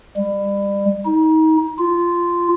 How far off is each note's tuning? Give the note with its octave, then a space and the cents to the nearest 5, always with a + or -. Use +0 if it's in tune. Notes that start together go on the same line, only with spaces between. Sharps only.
G3 +30
D#4 +30
F4 -10